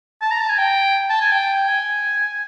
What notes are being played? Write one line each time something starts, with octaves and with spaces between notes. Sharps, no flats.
A5
A#5
A5
G#5
G5
A5
G#5
G5
G#5